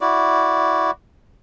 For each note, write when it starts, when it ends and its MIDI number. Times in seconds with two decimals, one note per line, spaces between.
0.01 0.91 64
0.01 0.91 66
0.01 0.91 74